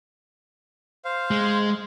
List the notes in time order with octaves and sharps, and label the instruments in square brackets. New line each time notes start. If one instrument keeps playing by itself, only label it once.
[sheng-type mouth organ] C5 F5
[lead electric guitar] G#3